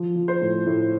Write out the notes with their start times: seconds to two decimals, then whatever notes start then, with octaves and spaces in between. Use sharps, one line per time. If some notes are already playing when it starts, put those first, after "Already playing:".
Already playing: F3
0.16 F3
0.28 C5
0.42 A2
0.66 A2